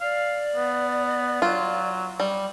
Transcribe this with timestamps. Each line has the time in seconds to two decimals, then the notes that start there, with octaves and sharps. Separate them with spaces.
0.01 D5 F5
0.56 B3
1.42 F#3 F4
2.20 G3